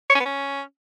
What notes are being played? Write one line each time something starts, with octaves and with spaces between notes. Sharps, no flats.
C#5
C#4
B3
C#4